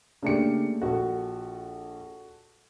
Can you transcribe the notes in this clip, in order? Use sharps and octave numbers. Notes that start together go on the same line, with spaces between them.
C#3 A3 A#3 D4 G4 C#7
A#1 F#4 A4